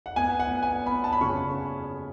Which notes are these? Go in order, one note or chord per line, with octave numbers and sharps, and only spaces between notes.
F#5
B3 G#5
F#5
B3
G#5
B3 B5
A5
B5
C#3 C#6